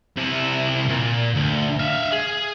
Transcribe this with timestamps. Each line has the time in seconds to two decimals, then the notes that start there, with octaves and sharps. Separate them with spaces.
0.17 C3 E4
0.89 A#2
1.35 D2
1.79 E5 F5
2.12 G#4